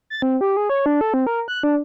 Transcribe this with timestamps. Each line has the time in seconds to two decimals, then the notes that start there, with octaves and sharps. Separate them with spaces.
0.10 A6
0.22 C4
0.41 G4
0.57 G#4
0.69 C#5
0.86 D4
1.01 A4
1.14 C4
1.27 A#4
1.48 F#6
1.63 D4